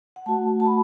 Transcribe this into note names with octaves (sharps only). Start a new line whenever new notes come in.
F#5
A3 F#4 A5
A5
B5